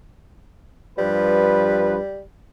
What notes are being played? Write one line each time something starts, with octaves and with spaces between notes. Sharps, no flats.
G2 F3 G3 B4